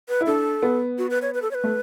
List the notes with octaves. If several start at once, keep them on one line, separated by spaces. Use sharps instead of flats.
B4
E4
D4 A4
B3
F#4
B4
C#5
B4
A4
C#5
B4
A3